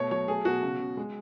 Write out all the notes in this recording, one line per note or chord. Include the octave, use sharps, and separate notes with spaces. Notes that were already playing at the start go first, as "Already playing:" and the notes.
Already playing: B2 A3 C#5
F#3 C#5
A3 G#4
B2 F#4
C#3
C#3
G#3